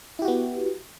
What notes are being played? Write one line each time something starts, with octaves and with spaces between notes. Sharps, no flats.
B3 E4 F#4 G4